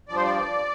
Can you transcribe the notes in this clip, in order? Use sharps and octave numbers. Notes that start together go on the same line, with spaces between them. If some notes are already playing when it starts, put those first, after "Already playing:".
G2 F3 D5
C5
D5